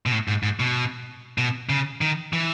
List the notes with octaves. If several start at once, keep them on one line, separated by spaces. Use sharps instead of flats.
B2
A2
G#2
G#2
B2
B2
C#3
D#3
E3